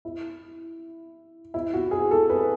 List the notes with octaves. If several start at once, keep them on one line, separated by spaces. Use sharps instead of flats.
E4
E4
F#4
G#4
A4
B4